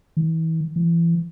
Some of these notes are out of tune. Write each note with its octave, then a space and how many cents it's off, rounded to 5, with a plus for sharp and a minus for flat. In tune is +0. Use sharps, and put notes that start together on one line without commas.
E3 -35
E3 +30